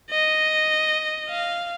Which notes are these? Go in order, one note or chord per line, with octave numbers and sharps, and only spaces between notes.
D#5
F5